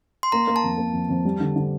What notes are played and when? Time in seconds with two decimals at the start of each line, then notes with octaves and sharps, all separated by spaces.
0.23 C6
0.32 A#3 A#5
0.47 A#3
0.56 A5
0.64 F2
0.78 A#3
0.94 F2
1.09 F2
1.25 G3
1.40 D3
1.56 D3